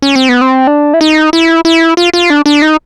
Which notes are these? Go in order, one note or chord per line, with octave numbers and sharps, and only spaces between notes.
C#4
C4
B3
C4
D4
E4
D#4
E4
E4
F4
F4
D4
D4
D#4